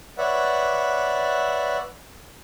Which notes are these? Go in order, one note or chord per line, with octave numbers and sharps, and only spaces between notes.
B4 C#5 D5 E5 F#5